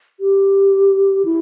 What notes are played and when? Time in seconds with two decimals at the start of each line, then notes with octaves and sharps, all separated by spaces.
0.20 G4
1.25 E4